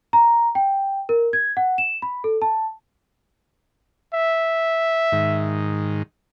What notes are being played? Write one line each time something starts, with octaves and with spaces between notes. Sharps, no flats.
A#5
G5
A#4
G#6
F#5
E7
B5
A4
A5
E5
G#2 D#3